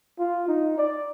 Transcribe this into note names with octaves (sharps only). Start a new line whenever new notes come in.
F4
D#4
D5